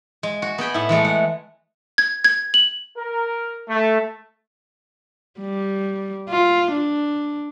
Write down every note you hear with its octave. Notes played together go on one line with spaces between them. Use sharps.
G#3
F#4
B3 G#4 G5 B5
A2 E4
E3 G#3 A3
F#5
G#6
G#6
F#7
A#4
A3
G3
F4
D4